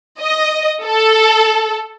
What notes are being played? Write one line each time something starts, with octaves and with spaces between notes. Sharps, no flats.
D#5
A4